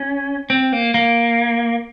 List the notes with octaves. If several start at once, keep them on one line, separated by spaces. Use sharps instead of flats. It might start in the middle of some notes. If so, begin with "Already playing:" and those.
Already playing: C#4
C4
A#3
A#3